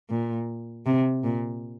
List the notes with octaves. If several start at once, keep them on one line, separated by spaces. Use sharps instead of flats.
A#2
C3
A#2